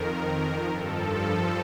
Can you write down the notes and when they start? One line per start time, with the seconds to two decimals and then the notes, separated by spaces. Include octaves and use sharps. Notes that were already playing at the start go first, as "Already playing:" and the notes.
Already playing: F2 D#3 A#4
0.66 G2 F3 A4